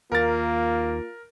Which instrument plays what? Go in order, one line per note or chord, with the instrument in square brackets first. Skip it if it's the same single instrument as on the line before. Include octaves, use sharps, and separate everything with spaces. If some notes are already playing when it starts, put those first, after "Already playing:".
[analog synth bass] D#2 [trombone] A#3 [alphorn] F4 [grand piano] A#4 A6